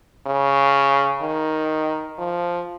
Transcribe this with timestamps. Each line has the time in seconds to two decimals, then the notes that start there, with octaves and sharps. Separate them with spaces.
0.27 C#3
1.22 D#3
2.18 F3